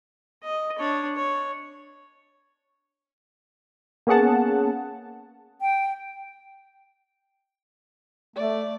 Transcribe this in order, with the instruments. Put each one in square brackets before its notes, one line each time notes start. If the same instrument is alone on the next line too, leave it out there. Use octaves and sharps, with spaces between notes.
[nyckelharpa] D#5
D4 C#5
C#5
[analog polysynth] A#3 B3 C#4 G#4 F#5 A5
[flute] G5
[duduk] A3 [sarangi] D5